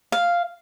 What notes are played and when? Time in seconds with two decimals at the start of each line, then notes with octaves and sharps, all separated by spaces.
0.12 F5